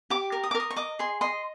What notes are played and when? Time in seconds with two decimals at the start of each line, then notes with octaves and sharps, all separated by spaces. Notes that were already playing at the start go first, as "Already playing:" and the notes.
0.10 G4 D6
0.32 A#4
0.43 D#6
0.51 D6
0.55 A#4
0.60 D#6
0.70 C#6
0.76 D#5 D6
0.99 G#4 C6
1.21 D#5 C6